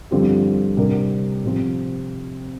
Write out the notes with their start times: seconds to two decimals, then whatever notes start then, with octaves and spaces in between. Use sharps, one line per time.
0.11 G2 D3 F3 C4 G4
0.77 C3 G3 D4 G4 A#4
1.45 C3 F3 C4